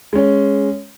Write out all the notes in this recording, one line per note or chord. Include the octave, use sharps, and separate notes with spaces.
G#3 C#4